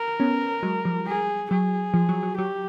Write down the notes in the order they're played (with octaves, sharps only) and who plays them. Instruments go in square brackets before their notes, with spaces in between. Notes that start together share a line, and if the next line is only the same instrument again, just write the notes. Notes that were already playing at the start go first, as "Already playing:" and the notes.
Already playing: [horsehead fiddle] A#4
[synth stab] B3 C#4
F#3 G#3
F3 G3
[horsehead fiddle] G#4
[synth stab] F#3 [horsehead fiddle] G#4
[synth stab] F3
F#3
F#3
[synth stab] F#3 [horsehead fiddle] G4